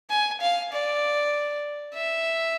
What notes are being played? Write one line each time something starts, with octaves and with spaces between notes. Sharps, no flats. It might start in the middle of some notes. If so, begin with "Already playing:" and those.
G#5
F5
D5
E5